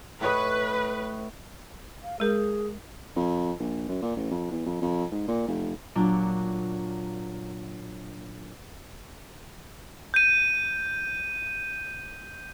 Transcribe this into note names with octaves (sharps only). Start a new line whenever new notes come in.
A2 B4 C#5 D#5
F5
G#3 G#4 A#4
F2
A#1
F#2
A#2
A1
F2
E2
F2
F2
G#2
A#2
F1
A#2 F#3 D4
G6 D#7